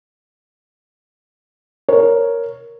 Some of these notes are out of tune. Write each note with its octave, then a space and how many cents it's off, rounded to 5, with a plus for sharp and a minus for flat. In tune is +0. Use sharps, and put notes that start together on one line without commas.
A#4 +0 C#5 +0